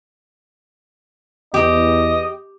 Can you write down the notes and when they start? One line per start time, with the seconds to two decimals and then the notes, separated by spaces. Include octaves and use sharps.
1.54 E2 G4 D#5